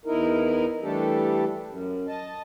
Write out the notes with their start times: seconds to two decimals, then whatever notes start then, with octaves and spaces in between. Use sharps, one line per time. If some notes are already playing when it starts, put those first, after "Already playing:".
0.06 E2 D#4 E4 A#4
0.82 E3 G3 A3 D4 G4 A4
1.68 F#2
2.08 D#5 A5